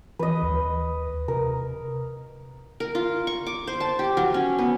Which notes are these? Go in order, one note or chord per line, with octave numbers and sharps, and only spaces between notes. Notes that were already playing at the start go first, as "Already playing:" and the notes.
E3 B4 D#5
D#2
C3 A#4
A#4
F4
C#6
D6
C5
A5
G4
F#3
C#4
B3